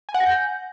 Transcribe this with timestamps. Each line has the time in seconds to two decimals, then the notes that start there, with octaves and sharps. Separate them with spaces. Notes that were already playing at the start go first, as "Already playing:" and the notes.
0.09 G#5
0.14 F#5
0.20 A#6
0.26 G6